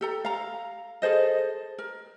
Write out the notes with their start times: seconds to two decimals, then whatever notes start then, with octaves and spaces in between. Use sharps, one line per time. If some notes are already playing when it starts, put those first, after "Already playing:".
0.01 G4 A4 A#5
0.25 F5 A#5
1.02 G#4 A4 C5 D#5
1.78 A#4